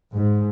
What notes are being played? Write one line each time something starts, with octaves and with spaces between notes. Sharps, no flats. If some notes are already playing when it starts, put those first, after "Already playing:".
G#2